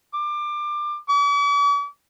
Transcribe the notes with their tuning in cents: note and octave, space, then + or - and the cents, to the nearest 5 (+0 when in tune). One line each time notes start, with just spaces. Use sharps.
D6 +25
D6 -45